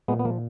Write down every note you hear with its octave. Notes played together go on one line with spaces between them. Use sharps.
A#2 G#3 B3
B3
F3 A#3